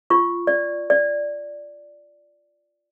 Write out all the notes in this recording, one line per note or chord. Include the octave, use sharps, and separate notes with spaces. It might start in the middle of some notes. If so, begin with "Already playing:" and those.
F4 C#6
D5
D5